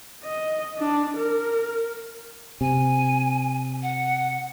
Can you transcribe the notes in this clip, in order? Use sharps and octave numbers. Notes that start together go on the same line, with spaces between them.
D#5
D4
A#4
C3 G#5
F#5